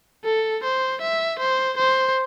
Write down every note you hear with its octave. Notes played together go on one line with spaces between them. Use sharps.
A4
C5
E5
C5
C5